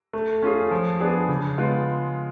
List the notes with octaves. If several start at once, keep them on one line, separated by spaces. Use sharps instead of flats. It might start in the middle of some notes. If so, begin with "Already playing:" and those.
A3
C#4 F4 G#4
F3
B3 D4 G#4
C#3
G#3 B3 F4